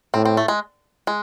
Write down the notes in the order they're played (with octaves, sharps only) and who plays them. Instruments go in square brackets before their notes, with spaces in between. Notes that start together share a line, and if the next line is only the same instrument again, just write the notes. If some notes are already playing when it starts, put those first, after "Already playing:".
[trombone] A2 [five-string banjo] C4
[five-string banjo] C4
A3
G#3
G#3